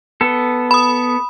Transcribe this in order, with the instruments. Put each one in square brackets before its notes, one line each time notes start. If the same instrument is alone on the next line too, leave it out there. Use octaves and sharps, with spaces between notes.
[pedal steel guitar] B3 A4
[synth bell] B5 D#6